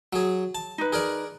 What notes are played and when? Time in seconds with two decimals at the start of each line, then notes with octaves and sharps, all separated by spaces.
0.13 F#3 G#4
0.55 A5
0.78 D#4 B4
0.93 G#4 A#4 D5